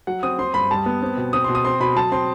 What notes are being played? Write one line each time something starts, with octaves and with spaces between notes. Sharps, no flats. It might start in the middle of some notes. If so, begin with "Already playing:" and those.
F#3 F#5
C4 D#6
C4 C6
G2 B5
G3 A5
B3
C4
B2
C4 D#6
B2 C6
D#6
C4 C6
B2 B5
F#3 A5
C4 C6